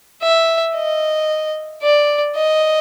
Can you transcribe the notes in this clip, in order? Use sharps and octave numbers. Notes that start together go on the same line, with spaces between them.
E5
D#5
D5
D#5